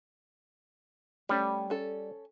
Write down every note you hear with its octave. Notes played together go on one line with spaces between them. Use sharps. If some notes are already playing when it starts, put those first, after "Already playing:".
G3 A3 C#4
C#4 A4